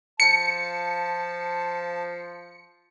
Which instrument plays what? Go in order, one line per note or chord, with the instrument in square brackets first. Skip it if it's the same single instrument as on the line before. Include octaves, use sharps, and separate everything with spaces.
[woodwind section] F3 [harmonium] A5 [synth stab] C#7